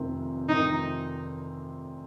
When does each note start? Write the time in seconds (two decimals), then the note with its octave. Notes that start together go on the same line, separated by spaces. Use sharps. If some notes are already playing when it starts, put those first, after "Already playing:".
Already playing: F1 F2 C3 D#3 C4
0.48 F1 F2 C3 D#3 C4 D#4